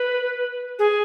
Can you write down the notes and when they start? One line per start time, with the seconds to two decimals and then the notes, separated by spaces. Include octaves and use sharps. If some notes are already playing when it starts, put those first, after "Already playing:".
Already playing: B4
0.79 G#4